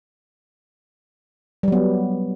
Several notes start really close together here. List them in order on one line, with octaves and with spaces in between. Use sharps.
G3 F#3 B3